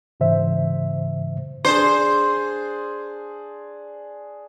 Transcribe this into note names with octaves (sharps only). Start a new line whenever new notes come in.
G#2 C#3 E3 C5 E5
D4 G#4 C5